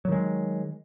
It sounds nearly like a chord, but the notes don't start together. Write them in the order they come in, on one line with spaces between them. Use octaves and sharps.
F#3 D#3 G#3